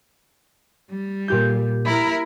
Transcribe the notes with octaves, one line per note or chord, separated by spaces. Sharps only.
G3
A#2 G4 G6
E4 A#4 B5